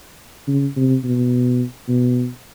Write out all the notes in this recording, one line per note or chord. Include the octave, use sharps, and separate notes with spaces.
C#3
C3
B2
B2